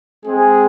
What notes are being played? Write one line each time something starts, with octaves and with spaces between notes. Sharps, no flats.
G#3 C4 G#4